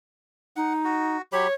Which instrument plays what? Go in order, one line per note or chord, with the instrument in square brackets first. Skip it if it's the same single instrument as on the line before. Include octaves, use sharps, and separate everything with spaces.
[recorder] D#4 [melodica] F#5
[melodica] F#4
[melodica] F#3 G4 B5 [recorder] C#5